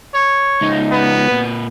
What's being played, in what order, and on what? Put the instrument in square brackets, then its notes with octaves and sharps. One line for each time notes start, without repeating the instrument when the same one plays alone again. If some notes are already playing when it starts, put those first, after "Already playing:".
[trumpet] C#5
[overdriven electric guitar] C#2 D#4
[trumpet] B3
[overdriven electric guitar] A#2 B4